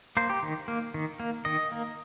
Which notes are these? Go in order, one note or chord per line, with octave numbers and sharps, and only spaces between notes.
A#3 C5
G4
D#3
A#3
D#3
A#3
D#3 D#5
A#3